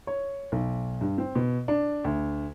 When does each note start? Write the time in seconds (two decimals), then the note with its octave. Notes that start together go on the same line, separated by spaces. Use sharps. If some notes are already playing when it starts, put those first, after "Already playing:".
0.07 C#5
0.52 B1
1.01 G2
1.18 C4
1.35 B2
1.68 D4
2.04 D2